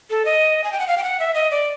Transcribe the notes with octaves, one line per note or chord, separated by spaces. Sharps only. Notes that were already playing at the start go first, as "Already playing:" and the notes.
A4
D#5
G#5
G5
F#5
F5
G5
F#5
E5
D#5
D5